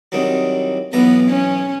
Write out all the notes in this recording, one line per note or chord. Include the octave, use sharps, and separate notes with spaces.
C2 D#3 F#3
B1 E3 B3 A#5
C#4